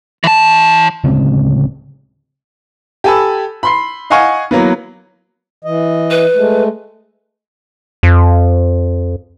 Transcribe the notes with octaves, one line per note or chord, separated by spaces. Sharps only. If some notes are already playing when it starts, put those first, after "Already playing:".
E3 A5
D1 C#3 G#3 C4
G4 A4 G#5 A5 B5 E6
B5 C6 C7
D#5 F5 F#5 G#5 C#6
E3 F#3 A#3 B3
E3 D#5
B4
G#3 A3
F2